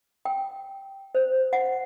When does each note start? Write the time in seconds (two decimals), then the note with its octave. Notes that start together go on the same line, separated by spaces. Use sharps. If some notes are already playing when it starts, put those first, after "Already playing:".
0.25 G5
1.15 C5
1.53 F#5